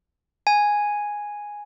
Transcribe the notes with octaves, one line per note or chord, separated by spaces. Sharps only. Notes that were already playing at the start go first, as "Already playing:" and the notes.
G#5